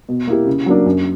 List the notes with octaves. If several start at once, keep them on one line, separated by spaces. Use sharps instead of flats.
B2
A#3 E4 G4
C#3
F#3 A#3 D4
F#2